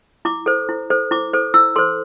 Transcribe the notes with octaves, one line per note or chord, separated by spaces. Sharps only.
E4 D6
A4 C5
E4
A4 C5
E4 D6
A4 C5
E4 E6
A4 C5 C6